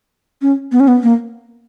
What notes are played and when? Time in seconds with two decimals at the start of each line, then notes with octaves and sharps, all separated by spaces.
0.42 C#4
0.72 B3
0.80 C#4
0.88 B3
1.03 A#3